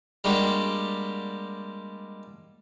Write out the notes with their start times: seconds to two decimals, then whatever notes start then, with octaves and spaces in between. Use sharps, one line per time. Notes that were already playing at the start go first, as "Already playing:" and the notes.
0.24 G3 G#3 A#3 D4 F#4 G4